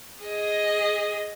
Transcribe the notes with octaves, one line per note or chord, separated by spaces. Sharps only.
G#4 D#5